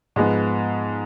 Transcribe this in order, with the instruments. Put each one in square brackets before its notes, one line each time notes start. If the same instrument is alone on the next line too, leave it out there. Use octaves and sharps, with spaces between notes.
[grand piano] G#2 F3 G#3 B3